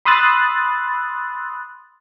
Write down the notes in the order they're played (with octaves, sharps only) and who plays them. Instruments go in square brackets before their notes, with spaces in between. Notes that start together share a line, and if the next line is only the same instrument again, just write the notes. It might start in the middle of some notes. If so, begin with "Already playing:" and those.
[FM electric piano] B5 C6 D#6 E6 F#6 A6